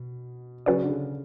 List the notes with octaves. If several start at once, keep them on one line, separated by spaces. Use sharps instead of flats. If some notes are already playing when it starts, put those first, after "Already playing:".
Already playing: B2
C#3 F#3 C#4 F#4 B4 D5
D3
C#3